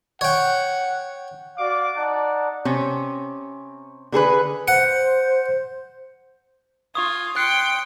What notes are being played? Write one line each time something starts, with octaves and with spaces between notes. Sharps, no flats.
C#5 F#5 G5
F#4 D5 F5 D6
D#4 D5 F#5 A5
C3 C#4
D3 G#4 A4 B4
C5 F#5
F4 G#5 C#6 D#6
G5 C6 F#6 C#7